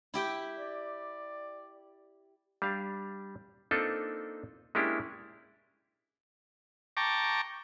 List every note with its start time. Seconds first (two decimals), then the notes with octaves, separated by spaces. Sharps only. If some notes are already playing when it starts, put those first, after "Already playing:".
0.14 E4 G4 G5
0.59 D5
2.62 G3 D4 F5
3.71 A#3 C4 D4 D#4 F4 A4
4.75 G#3 A#3 C#4 D4 E4 G4
6.97 G5 A5 A#5 C#6 D6